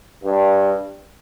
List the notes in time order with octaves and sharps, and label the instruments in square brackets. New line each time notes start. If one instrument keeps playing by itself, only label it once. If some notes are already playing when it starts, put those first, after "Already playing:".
[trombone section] G2